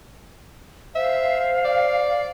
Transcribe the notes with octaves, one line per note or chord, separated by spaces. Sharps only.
C5 E5 F5
D5